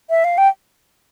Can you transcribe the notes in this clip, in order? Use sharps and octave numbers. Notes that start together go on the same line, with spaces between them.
E5
F5
G5